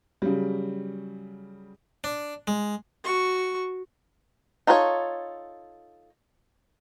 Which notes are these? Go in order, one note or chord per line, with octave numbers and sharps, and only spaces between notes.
C#3 F#3 G3
D4
G#3
F#4 C#6
D#4 F4 A4 B4 C#5